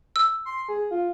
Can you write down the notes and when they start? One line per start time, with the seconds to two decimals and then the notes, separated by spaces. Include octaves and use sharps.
0.16 E6
0.45 C6
0.69 G#4
0.91 F4